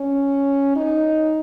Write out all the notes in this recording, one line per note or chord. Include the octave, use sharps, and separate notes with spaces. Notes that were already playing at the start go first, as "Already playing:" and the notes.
Already playing: C#4
D#4